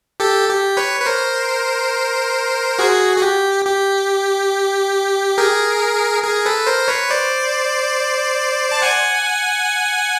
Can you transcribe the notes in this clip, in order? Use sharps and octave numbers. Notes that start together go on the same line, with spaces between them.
G4 A4
G4
B4 C#5
B4
A#4 C5
F#4 G#4
G#4
G4
G4
G#4 A#4
G#4 A#4
A4 B4
A#4 C5
B4 C#5
C5 D5
A5
F#5 G#5